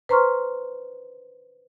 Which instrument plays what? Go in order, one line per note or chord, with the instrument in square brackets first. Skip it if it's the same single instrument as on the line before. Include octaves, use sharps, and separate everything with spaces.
[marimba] B4 C5 A#5 C6 C#6 F6